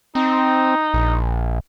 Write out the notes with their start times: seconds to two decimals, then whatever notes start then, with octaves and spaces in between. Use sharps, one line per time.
0.15 C4 D#4
0.94 A#1